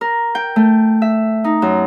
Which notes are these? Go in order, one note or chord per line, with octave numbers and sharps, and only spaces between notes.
A#4
G5
A3
E5
D#4
F#2